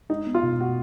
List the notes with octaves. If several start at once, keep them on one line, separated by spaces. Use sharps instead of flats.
G#3 D#4
B3
F4
B2
B2 F#4